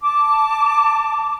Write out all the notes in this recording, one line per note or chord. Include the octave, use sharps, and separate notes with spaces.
A5 D6